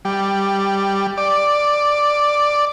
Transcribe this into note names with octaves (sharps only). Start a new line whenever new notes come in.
G3
D5